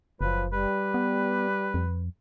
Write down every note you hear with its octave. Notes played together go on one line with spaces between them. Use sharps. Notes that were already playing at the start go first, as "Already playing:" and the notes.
F#1 F3 F#3 B4
G3 B4
B3
F2